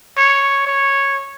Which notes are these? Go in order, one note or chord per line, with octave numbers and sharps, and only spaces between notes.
C#5
C#5